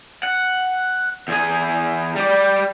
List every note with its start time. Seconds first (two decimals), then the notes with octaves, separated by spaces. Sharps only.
0.23 F#5
1.28 E2 G#4
2.16 G3 D5